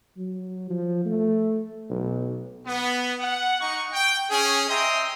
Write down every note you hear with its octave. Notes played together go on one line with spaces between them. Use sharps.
F#3
F3
A3
B1
B3
F#5
D#4 C#6
G5
C#4 G#4
D#5 E5 G5 A#5 C6 D#6